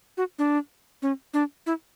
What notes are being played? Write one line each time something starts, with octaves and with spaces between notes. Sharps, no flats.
F#4
D4
C#4
D4
E4